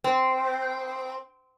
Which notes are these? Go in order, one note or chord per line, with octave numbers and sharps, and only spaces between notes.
C4